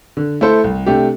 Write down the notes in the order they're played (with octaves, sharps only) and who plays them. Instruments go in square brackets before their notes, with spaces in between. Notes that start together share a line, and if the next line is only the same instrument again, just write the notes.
[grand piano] D3
A3 E4 A4 C5
C2
C3 A3 D4 G4